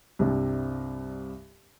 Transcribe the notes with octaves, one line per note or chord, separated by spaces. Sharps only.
C2 G2 C3 D4